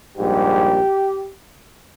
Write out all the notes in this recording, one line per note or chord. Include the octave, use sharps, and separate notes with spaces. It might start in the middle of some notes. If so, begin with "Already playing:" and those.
A#1 G#2 G3 G4